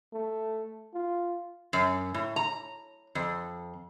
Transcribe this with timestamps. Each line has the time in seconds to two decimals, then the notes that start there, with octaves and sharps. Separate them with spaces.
0.13 A3
0.94 F4
1.73 F#2
2.14 A2
2.36 A#5
3.15 F2